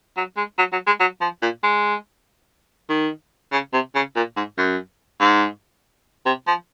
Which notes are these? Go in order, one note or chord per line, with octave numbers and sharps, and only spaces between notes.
F#3
G#3
F#3
F#3
G#3
F#3
F3
A#2
G#3
D#3
C#3
C3
C#3
A#2
G#2
F#2
G#2
C3
F3